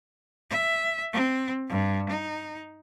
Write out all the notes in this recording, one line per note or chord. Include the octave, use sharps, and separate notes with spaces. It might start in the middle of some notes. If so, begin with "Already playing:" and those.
E5
C4
G2
D#4